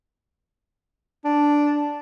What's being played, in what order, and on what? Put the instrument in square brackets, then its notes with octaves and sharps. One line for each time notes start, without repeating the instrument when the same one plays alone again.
[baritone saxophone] D4